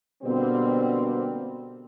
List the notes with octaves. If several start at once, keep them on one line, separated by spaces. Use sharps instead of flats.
B2 D3 G3 A#3 C4